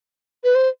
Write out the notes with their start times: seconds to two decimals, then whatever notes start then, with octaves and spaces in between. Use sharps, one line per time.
0.44 B4
0.55 C5